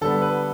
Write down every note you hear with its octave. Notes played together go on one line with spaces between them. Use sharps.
D3 G3 B3 A4
B4